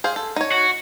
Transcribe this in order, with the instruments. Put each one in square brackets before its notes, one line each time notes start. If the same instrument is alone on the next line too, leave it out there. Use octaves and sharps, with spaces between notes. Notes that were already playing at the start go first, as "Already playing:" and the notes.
[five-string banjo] G#4 C5 F5
A4
D#4 C#5
[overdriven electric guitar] F#4